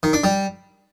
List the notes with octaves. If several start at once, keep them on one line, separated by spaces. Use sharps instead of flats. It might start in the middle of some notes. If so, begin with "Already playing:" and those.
D#3
D4
G3